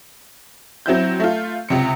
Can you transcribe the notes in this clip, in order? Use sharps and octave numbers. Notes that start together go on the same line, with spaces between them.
F#3 C4 E4 G6
A3 F4
C#2 C3 C#7